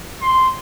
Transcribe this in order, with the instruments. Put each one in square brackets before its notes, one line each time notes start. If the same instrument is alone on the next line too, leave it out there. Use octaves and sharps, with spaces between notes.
[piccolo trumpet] C6